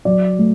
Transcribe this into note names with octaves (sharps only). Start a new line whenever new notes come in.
F#3 D5
A3